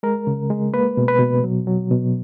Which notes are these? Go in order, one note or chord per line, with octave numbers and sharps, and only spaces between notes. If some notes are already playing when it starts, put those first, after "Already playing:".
G#3 A#4
C#3
G#3
A#3 B4
B2
B4
B2
F#3
F#3
B2